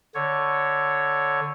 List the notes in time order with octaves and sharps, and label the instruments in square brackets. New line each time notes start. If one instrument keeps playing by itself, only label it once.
[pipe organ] D3 C#5